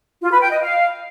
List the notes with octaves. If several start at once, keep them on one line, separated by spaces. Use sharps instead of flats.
F4
B4
G5
D#5
F5